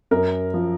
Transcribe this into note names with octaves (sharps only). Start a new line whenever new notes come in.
F#2 A#4
F3